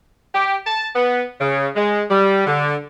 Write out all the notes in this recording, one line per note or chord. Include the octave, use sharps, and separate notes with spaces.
G4
A5
B3
C#3
G#3
G3
D3